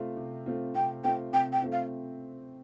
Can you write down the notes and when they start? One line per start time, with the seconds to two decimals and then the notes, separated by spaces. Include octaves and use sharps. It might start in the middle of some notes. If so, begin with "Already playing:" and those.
Already playing: C3 A3 C4 F4
0.17 C3
0.46 A3 C4 F4
0.75 C3 G5
1.04 A3 C4 F4 G5
1.33 C3 G5
1.53 G5
1.62 A3 C4 F4
1.72 F5